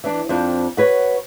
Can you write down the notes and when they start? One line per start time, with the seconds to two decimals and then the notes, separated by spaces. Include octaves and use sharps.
0.04 E3 D4
0.29 F2 C4 D4
0.77 F#4 B4 C#5